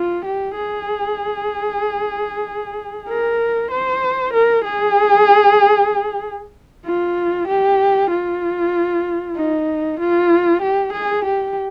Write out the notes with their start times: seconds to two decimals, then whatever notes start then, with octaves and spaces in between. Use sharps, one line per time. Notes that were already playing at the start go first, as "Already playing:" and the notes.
Already playing: F4
0.25 G4
0.56 G#4
3.08 A#4
3.71 C5
4.33 A#4
4.64 G#4
6.85 F4
7.48 G4
8.10 F4
9.36 D#4
10.00 F4
10.62 G4
10.93 G#4
11.25 G4